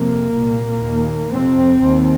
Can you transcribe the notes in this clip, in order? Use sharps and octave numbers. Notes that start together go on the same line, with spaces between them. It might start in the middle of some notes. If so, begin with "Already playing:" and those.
Already playing: F2 C3 A#3
C2 A#2
D#2
F2 C3 C4
D#2